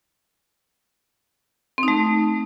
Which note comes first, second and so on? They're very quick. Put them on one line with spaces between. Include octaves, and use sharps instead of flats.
C4 D#4 A3